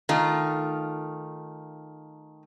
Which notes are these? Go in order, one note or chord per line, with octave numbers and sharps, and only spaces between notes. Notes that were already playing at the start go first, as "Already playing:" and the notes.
D#3 A3 F4